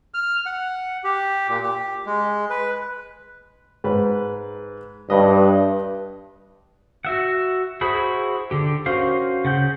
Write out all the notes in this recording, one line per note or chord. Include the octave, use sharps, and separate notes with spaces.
F6
F#5
G4
A#2
G4
G#3
B4
G#2 B4
G2 B4 D#5
F#4 E5 F#5
E4 F#4 G#4 C5 B5
D3 G4
C#4 F#4 A#4 C5 F5
C#3 F#5 G6